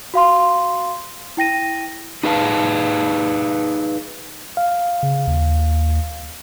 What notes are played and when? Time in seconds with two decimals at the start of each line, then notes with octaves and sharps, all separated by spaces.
0.14 F#4 F5 C6
1.37 E4 G5 A#6 D#7
2.23 D#4 G#4 B4 F5 A5
4.57 F5
5.03 C#3
5.27 D#2